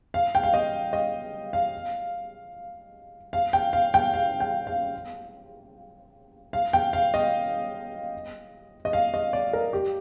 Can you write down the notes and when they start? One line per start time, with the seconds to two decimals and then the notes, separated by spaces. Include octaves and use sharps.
0.14 F5
0.35 G5
0.43 F5
0.54 D#5
0.93 D#5
1.53 F5
3.33 F5
3.53 G5
3.73 F5
3.94 G5
4.14 F5
4.40 G5
4.67 F5
6.53 F5
6.73 G5
6.93 F5
7.14 D#5
8.85 D#5
8.93 F5
9.14 D#5
9.33 D5
9.53 A#4
9.73 G4